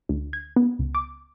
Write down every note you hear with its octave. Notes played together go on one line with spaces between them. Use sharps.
D2
G#6
B3
C#2
D6